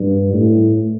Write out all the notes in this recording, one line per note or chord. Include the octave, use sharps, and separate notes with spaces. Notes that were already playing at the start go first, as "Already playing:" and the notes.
Already playing: G2
A2